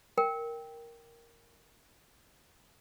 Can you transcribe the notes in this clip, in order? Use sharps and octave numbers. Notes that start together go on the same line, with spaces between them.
A#4 G5